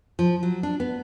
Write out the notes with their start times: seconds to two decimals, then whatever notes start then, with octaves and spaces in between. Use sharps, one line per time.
0.19 F3
0.43 F#3
0.63 D4
0.80 B3